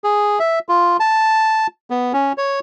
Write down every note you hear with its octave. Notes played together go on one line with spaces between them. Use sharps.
G#4
E5
F4
A5
B3
C#4
C#5